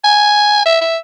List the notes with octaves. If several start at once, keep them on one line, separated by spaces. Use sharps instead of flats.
G#5
E5
E5